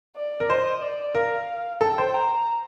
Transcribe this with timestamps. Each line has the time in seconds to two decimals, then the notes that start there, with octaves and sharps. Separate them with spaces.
0.17 D5
0.40 A#4
0.49 C5 D#5
0.82 D5
1.15 A#4 F5
1.81 A4 G5
1.98 C5
2.14 A#5